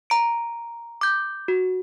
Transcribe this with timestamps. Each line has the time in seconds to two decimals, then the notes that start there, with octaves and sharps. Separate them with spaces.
0.10 A#5 D7
1.01 D6 G6
1.48 F#4